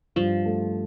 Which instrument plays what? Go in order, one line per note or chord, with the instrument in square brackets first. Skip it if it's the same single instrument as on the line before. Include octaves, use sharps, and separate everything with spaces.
[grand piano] G2 [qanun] F3
[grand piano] A3